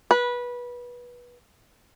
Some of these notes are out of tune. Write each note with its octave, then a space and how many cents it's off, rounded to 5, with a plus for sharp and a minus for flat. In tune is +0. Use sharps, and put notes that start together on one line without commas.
B4 -20